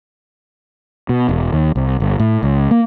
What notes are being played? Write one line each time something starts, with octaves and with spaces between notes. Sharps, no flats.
B2
E1
D#2
C2
G1
A2
C#2
A#3